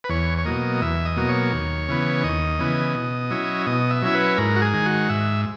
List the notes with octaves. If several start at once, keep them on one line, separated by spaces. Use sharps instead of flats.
B4
E2 C#5
C#5
B2 F#3 A#3 D#5
E2 E5
D#5
B2 F#3 A#3
C#5
D#2
C#3 E3 B3
D#2 D#5
C#3 E3 B3
B2
F#3 C#4 E4
B2 D#5
E5
F#3 C#4 E4
B4
G#2 A#4
F#4
G#4
D#3 G#3
F#4
G#2 E5